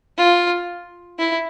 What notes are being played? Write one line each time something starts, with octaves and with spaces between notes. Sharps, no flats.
F4
E4